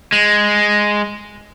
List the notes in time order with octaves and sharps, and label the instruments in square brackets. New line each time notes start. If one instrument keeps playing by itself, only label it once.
[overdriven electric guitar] G#3